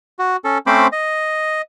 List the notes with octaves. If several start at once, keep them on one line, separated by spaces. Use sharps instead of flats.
F#4
C#4 A4
A3 C4 C#4 C5 B5 D6
D#5